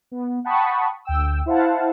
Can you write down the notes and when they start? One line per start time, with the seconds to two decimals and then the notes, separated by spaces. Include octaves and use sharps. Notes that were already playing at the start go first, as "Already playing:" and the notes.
0.12 B3
0.44 F#5 G5 A5 B5 C#6 D#6
1.05 D2 G5 E6
1.46 E4 C5 F5 F#5 A5